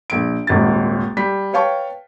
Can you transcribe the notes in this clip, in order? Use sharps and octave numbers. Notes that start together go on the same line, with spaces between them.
A#1 D7
D#1 G#1 A6
G3 B6
B4 C#5 F5 G5 A5 C#6